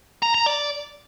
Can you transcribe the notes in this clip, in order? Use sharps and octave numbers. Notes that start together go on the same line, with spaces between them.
A#5
A#5
D5